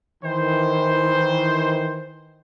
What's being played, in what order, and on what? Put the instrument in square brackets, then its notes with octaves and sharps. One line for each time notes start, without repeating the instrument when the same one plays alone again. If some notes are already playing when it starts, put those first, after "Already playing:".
[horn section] D#3 E3 C5